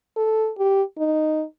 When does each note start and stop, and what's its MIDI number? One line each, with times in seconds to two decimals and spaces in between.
0.16 0.51 69
0.58 0.83 67
0.98 1.44 63